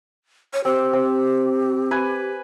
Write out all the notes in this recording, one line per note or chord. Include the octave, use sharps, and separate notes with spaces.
C#5
C4 G4
C4
B4 G#5